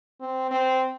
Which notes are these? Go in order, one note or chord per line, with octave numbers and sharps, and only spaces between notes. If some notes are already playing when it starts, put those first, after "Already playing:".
C4
C4